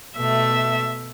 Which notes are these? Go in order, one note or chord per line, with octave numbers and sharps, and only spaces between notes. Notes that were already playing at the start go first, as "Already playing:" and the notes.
B2 A3 E5